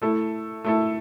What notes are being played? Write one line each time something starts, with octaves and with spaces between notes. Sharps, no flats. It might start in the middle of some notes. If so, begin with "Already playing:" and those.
A3 E4 A4
A3 E4 A4